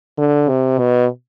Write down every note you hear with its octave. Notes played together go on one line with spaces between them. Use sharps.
D3
C3
B2